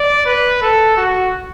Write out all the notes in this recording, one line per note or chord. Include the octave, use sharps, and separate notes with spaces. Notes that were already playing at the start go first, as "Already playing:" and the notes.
Already playing: D5
B4
A4
F#4